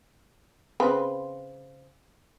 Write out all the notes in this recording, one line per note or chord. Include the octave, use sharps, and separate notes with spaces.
C#3 C4 B4